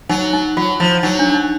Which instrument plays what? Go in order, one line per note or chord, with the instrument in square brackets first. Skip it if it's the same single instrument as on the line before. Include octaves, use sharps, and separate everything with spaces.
[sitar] F#3 [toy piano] D#4
[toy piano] D#4
[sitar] F#3 [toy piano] F4
[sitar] F3 [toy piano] E4
[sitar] F#3 [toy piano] D#4
[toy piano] D4
D4
D#4